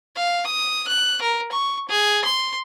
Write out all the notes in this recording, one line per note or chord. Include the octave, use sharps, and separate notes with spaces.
F5
D#6
F#6
A#4
C#6
G#4
C6